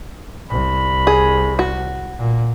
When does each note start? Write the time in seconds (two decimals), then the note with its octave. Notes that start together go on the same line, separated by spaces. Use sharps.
0.49 C2 B5
1.07 G#4
1.59 F#4
2.19 A#2